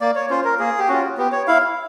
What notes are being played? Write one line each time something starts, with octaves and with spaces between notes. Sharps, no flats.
A#3 D5
C#5
C#4 F4 C5
A#4
A#3 G#4
G4
C#4 F4 F#4
B3 G4
C#5
E4 F5